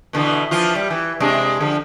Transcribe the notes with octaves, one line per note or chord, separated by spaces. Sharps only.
B2 D3 E3
E3 F3 F4
G3
E3
C3 G#3 D4
D3 F3